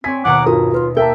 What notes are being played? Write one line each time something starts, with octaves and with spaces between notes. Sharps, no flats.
C4 C#5 D5 G#5 B6
D#2 B2 F#5 A#5 D6
G2 F4 F#4 A#4 D#6
F4 B4
A#3 A#4 E5 G5 A5